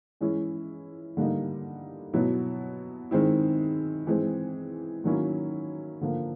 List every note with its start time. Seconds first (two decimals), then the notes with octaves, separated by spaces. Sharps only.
0.21 E3 G#3 C#4 E4
1.17 D3 G3 A#3 D#4
2.13 B2 F#3 B3 E4
3.11 D#3 G#3 C4 E4
4.07 E3 G#3 C4
5.04 D#3 F#3 A#3 C#4 E4
6.01 D3 F3 A#3